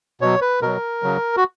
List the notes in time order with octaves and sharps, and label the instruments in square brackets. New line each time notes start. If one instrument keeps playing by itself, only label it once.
[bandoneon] B2 F#3 C#5
B4
B2 F#3 A#4
C#3 F#3
F#4